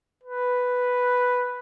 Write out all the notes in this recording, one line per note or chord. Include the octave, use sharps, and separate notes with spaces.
B4